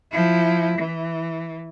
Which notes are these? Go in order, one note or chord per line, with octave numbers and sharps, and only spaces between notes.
F3 E4
E3